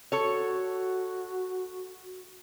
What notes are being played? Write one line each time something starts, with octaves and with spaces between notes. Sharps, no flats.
F#4 A4 C#5